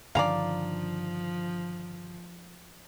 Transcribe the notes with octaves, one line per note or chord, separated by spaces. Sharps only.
G2 D3 D#3 F3 C#4 D5 F5 A#5